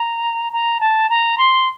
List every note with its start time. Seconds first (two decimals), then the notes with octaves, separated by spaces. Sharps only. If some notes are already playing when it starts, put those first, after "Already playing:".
Already playing: A#5
0.53 A#5
0.81 A5
1.10 A#5
1.38 C6